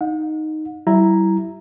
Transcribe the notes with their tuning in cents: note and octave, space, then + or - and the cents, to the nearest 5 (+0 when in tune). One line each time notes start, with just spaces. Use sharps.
D#4 +0 F#5 -40
G3 -40 E4 +0 A#5 +0